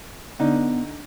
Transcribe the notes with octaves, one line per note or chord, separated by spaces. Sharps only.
D3 B3 D#4